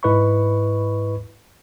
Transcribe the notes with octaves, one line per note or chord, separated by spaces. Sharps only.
G#2 E4 B4 D#5 B5 C#6